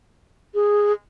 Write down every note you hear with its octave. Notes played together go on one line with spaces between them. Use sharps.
G#4